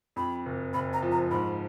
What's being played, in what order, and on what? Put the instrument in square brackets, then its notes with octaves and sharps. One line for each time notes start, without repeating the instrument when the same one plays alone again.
[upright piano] F2 [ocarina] B5
[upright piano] F#1
[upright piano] F#1 [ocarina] B5
[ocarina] A#5
[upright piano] F3
[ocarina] A#5
[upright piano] G#2 [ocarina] B5